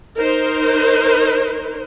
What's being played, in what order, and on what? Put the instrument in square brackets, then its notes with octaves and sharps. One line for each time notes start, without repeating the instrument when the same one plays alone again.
[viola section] D#4 A#4 C5